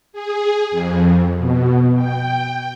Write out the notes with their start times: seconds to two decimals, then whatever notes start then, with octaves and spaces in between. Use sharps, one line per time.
0.13 G#4
0.71 F2
1.38 B2
1.95 G5